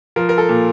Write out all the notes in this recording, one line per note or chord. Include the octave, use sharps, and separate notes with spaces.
F3 A#4
A#4
A4
A#2